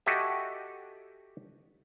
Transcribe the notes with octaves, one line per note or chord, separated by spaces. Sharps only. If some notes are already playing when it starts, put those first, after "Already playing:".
F#4 G4 A4 D#5 E5 G#5